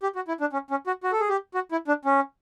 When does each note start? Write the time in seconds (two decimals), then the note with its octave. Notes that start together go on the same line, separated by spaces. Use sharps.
0.03 G4
0.15 F#4
0.28 E4
0.40 D4
0.53 C#4
0.70 C#4
0.87 F#4
1.04 F#4
1.12 A4
1.20 G#4
1.29 G4
1.54 F#4
1.72 E4
1.88 D4
2.05 C#4